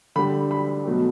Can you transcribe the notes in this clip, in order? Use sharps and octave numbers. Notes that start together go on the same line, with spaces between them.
D3 G3 B5
B5
B2 F#3 A3